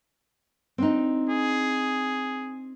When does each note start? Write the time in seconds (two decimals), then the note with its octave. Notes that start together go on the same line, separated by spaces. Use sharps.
0.78 C4 D4 D#4
1.30 G#4